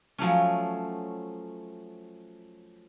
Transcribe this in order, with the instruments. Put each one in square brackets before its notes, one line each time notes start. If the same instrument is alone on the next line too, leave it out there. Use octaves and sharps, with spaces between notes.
[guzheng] F3 F#3 A3 C#4